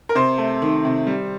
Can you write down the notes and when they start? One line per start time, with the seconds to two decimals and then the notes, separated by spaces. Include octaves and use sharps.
0.09 A#4
0.15 C3 C5
0.38 A3
0.62 D#3
0.85 C3
1.07 G3